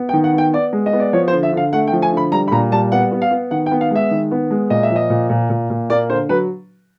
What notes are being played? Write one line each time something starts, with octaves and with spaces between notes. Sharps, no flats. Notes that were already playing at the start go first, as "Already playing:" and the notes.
Already playing: B3
G5
D#3
F#5
B3 G5
B3 D5
G#3
D#5
B3
D5
F3 C#5
C5
D3
E5
D3 F5
A3 F#5
G5
F3
G#5
D3 B5
G3 A#5
B5
A#2 A#5
G3 A5
B3 F#5
B3
F5
B3
D#3 F#5
G5
B3
F5
G#3 E5
D#3
B3
G#3
A#2 D#5
E5
F3
D#5
A#2
A#2
A#2
A#2
A#3 D5
D3 C5
F#3 B4